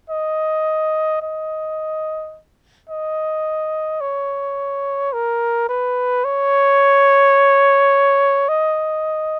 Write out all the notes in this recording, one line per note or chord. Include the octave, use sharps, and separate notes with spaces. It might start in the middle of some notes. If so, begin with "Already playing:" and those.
D#5
D#5
D#5
C#5
A#4
B4
C#5
D#5